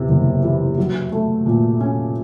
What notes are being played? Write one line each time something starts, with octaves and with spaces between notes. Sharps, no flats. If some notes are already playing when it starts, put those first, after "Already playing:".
Already playing: E2 C3
F#1
E3
F#3
A3
A#2
C#4